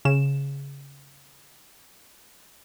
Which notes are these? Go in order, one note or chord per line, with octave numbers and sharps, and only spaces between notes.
C#3 E7